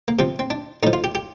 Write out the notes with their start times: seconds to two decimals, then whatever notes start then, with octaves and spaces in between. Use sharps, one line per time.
0.08 A#3
0.19 C3 F3 C4
0.39 C4
0.50 D4
0.83 A2 F3 D#4
0.93 F4
1.04 G4
1.15 G4